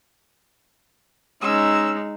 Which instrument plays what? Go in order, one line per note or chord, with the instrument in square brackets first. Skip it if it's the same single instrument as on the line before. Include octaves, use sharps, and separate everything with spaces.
[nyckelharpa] G#3 D#4 [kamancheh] C#4 E6